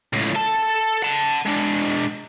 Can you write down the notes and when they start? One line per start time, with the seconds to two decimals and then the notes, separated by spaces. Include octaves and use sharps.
0.13 C#2 A2
0.35 A4 A5
1.02 F#5 A5
1.46 G#3 D4